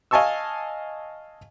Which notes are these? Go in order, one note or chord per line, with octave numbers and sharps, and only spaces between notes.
D#5 F5 G#5 A5 C#6 E6